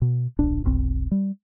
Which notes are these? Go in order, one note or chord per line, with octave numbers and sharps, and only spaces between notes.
B2
D1 A#1 D4
F1 B1 C4
G3